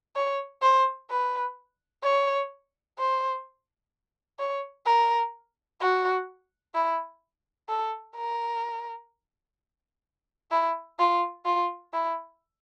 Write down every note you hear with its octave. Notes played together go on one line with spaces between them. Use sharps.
C#5
C5
B4
C#5
C5
C#5
A#4
F#4
E4
A4
A#4
E4
F4
F4
E4